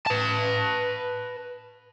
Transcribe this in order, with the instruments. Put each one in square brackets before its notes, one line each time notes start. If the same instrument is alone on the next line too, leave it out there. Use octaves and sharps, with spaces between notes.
[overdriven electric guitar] B4 A5